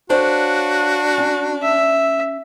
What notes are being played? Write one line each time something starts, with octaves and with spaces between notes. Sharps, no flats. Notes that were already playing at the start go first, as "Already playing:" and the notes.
D4 F#4 C5 C#5 F5
C#4
E5